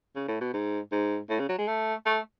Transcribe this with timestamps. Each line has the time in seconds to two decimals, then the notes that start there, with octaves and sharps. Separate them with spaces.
0.16 C#3
0.28 A2
0.41 B2
0.53 G#2
0.92 G#2
1.30 A2
1.40 C#3
1.49 F#3
1.58 G#3
1.68 A3
2.06 A3